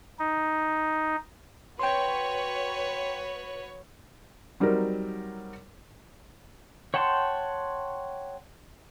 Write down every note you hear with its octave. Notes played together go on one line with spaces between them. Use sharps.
D#4
F#4 B4 C#5 G5 C6
F#3 G3 C4 D#4 A#4
C#5 F#5 G5 A5 C6